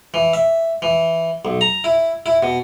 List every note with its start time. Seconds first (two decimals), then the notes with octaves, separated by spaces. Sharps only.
0.14 E3
0.33 E5
0.82 E3
1.45 B1
1.61 A#5
1.84 E4
2.26 E4
2.43 B2